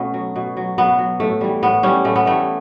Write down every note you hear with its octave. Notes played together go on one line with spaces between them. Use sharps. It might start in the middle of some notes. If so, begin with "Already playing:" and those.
Already playing: B2 A3 B3 C#4
F#3
B2
F#3
B2 B3
F#3
A2 A3
E3 G3
A2 B3
E3 G3 C#4
A2 A3
B3
E3 G3 A3